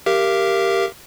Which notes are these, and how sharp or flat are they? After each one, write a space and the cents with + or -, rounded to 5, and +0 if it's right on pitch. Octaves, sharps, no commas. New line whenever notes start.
G4 +0 A#4 +0 F5 -45